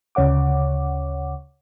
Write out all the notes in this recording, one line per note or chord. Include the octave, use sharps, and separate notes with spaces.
D2 C#3 C#5 F#5 D6